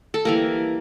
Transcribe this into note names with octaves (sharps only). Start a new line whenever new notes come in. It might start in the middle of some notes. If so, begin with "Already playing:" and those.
A4
E3 G3 A#3 A#4